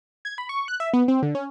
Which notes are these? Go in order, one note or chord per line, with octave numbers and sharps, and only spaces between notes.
G#6
B5
C#6
F#6
E5
B3
C4
D3
C#4